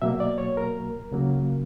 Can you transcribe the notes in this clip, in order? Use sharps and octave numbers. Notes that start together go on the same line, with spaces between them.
B2 F#3 A#3 E5
D5
C#5
A#4
C#2 C#3 F#3 A#3